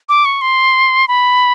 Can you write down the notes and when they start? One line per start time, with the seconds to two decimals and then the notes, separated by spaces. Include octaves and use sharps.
0.09 D6
0.25 C#6
0.41 C6
1.08 B5